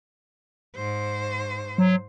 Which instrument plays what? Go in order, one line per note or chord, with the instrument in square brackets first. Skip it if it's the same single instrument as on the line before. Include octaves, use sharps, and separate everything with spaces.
[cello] G#2 C5
[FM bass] F#3